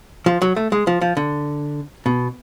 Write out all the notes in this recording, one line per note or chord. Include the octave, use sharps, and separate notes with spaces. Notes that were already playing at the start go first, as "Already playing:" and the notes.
F3
F#3
A3
G#3
F3
F3
D3
B2